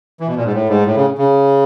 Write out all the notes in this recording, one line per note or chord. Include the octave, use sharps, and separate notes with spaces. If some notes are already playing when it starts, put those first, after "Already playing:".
E3
B2
A#2
G#2
A2
G#2
A2
C#3
C#3